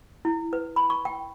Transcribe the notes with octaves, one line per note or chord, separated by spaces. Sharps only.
E4
B4
B5
C#6
G5